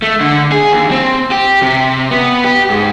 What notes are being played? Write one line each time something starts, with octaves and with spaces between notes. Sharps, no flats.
A3
D3
G#4
D#2
C4
G4
C3
B3
G4
G#2